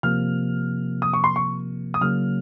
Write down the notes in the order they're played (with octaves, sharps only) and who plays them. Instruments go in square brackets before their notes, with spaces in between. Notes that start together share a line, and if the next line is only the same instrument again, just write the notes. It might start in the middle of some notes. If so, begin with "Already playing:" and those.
[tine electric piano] C3 F3 A#3 [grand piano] F6
[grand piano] D#6
C#6
C6
C#6
D#6
[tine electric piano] C#3 F#3 A#3 [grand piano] F6